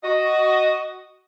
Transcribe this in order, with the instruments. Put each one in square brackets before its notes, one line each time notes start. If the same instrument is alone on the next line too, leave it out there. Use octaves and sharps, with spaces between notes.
[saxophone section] F#4 D#5